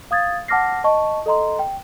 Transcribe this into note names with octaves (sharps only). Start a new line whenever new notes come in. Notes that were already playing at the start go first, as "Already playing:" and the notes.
F5 D#6 G#6 A6
F#5 A5 D6 F6 A#6 C7
D#5 A5 C#6
A4 D#5 A#5 C6
G5